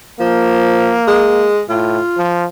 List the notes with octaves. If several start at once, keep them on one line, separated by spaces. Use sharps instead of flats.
F3 A#3
G#3
A2 F4
F3